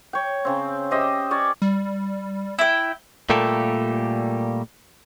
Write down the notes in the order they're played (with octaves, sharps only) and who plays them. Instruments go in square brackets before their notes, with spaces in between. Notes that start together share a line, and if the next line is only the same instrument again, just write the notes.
[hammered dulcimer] C#5 G5
C#3 C4
G4 C5 D#5 E5
C#4 C#5 D5 C6
[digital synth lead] G3
[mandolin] E4 G5
[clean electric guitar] A#2 G3 A3 A#3 G4 A4